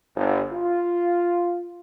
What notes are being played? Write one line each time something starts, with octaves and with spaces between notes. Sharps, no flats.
G1
F4